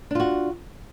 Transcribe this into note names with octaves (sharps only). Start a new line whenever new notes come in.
D4 F4 F#4